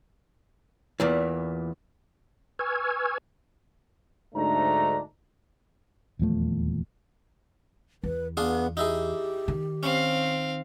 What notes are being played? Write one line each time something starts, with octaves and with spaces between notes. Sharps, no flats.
E2 A#2 E3
B4 G#5 C#6 E6 F6 G#6
D2 G#2 A3 D4 D#4 A#5
D#1 E2 F3 A3
E2 B4
B3 D4 F4 G#4
D#4 E4 G4 G#4
D#3
C4 C#4 F5